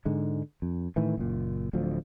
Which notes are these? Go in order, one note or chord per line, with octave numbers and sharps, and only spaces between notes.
G#2 D3 G#3
F2
A2 D#3 E3
F#1 A#2
D1 D2 F3